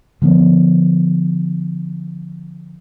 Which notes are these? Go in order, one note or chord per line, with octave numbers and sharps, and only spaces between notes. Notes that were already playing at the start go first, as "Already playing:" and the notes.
D3 F3 A3 B3